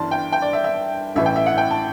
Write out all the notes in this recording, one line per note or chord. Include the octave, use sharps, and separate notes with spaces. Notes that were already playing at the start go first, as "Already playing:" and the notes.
Already playing: G1 G2 E3 D5 A5 C6
G5
G5
D5
E5
E5
A1 A2 E3 E5
G5
E5
F#5
G5
A5